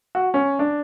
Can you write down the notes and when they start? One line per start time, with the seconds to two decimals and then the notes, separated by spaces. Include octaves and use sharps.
0.15 F#4
0.34 C#4
0.59 D4